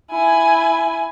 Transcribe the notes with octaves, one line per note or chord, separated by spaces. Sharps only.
E4 G#5